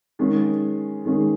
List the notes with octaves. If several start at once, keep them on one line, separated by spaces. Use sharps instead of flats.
D#3 G#3 C#4 G#4
D#3 G#3 C#4 G#4